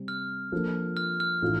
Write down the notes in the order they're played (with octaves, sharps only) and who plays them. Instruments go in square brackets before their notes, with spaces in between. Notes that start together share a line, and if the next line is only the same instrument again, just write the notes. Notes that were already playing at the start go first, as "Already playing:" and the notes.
Already playing: [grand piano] C3 G3 C4
[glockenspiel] F6
[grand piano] F3 A#3 D4 F4 A4
[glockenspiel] F6
F6
[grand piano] A2 E3 A3 D4 F4